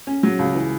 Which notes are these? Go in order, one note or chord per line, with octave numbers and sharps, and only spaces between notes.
C#4
F#3
C#2
E3